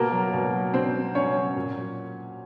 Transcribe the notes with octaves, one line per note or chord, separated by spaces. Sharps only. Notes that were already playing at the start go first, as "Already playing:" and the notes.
Already playing: B2 A#3 A#4
F#3
B2
F#3
B2 C4 C5
F#3
B2 C#4 C#5
F#3
A#2
F#3